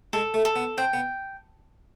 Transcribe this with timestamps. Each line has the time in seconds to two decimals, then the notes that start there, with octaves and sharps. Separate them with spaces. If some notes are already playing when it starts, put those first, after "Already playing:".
0.13 G#3 A4
0.34 A3
0.45 A4
0.56 B3
0.78 C4 G5
0.93 B3